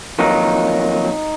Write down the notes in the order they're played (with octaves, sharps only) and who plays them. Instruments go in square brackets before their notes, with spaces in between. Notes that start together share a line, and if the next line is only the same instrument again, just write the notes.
[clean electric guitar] F2 D#3 F#3 A#3 D#4